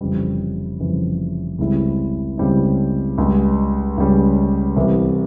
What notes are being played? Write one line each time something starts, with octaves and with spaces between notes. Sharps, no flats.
F1 F2 C#3 E3 G3
F1 F2 C#3 E3 G3
C#2 C#3 G3 C4 E4
C#2 C#3 G3 C4 E4
C#2 C#3 G3 C#4
C#2 C#3 G3 C#4
C2 C3 E3